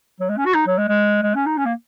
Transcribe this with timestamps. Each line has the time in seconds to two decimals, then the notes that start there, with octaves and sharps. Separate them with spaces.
0.20 F#3
0.29 G#3
0.37 C#4
0.46 F#4
0.54 D#4
0.67 F#3
0.78 G#3
0.88 G#3
1.22 G#3
1.35 C#4
1.46 D#4
1.57 C#4
1.65 A#3